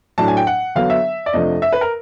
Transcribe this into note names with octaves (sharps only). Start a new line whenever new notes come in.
A2 F#3 A3 D4 A5
G#5
G5
F#5
D3 F#3 B3 F5
E5
D5
F2 C3 F3 A3 D4 D#5
E5
B4
A#4